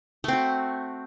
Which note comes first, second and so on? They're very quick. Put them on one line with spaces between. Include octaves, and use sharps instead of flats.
A3 C4 F#4